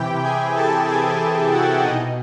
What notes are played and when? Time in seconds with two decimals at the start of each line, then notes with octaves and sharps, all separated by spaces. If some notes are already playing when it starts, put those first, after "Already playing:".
Already playing: C3 E3 E4 G4 G5
0.22 G#4 G#5
0.55 A4 A5
0.86 G#4 G#5
1.51 F#4 F#5
1.83 B2 D#4 D#5